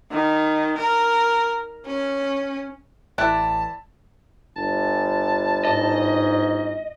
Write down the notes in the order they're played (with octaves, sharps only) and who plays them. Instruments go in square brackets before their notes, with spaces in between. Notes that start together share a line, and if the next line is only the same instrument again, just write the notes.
[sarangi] D#3
A#4
C#4
[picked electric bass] A1 [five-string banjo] E4 D5 [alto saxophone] A5 [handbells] F#6
[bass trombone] G1 [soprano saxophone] A5
[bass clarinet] G#2 [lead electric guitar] D#5